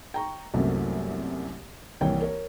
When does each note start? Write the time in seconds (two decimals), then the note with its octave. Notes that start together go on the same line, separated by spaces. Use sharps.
0.14 G5 A#5 C#6
0.54 C2 F#2 C3 F#3 A3 A#3
2.01 C2 E3 A#3 C#5 G5
2.22 A#4 C#5